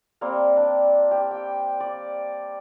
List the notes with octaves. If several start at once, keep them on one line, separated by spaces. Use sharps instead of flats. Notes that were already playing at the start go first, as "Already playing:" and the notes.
G3 A#3 C4
D4
G4
G5
D5